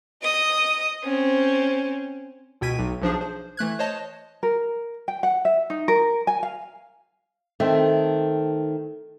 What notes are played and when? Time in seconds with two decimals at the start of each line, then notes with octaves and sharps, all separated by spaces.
0.23 D#5 D#6
1.03 C4 C#4
2.61 C#2 B2 G5 G#6 B6 D#7
2.79 B1
3.01 B1 F3 D4 G#4
3.21 C5
3.57 E3 A3 F#6 G#6
3.79 C5 C#5 D#5 A5
4.43 A#4
5.08 G5
5.23 F#5
5.45 E5
5.70 D#4
5.88 A#4
6.27 G#5
6.43 F5
7.60 D#3 A3 C4